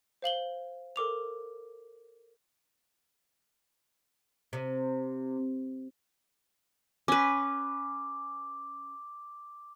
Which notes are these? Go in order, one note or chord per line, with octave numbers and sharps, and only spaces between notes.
C5 F5 F#7 G7
A4 A#4 D6 F7
C3
C#4 B4 D6